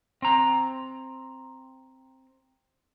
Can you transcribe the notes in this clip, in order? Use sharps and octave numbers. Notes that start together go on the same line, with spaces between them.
C4 A#5